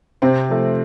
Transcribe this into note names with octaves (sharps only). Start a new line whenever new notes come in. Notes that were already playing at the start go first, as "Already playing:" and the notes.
C3 C4
F3 A3